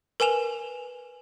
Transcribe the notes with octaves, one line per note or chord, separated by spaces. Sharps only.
A#4 B4 G#5 E7 F7